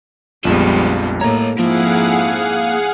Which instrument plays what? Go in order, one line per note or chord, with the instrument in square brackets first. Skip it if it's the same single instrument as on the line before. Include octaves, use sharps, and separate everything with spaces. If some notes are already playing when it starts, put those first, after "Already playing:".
[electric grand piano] A#1 F2 [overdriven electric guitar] F3 [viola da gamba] G3 G#3 B3
[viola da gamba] A2 [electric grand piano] A#3 A#5 [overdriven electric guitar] C#5 D#5
[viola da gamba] F2 G#2 E4 [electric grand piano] F3 [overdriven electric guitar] A#3 [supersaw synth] G#4 F5 F#5